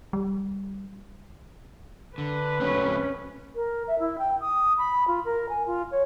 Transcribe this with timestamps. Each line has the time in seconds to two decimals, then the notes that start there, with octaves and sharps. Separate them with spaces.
0.13 G3
2.18 D3 B4
2.61 F#3 A3 C4 C#4
3.55 A#4
3.88 E5
3.99 E4
4.18 G5
4.41 D#6
4.78 B5
5.08 F4
5.25 A#4
5.49 G#5
5.66 F4
5.91 C#5